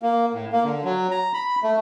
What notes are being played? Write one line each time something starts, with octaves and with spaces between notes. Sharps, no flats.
A#3
A2
A#3
D3
F#3
A#5
B5
A3